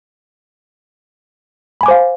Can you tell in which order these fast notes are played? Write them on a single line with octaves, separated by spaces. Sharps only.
B5 G#5 D6 C5 F5